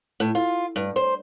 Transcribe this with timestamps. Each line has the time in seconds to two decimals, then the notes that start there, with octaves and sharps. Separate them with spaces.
0.20 A2
0.35 F4
0.76 G2
0.96 C5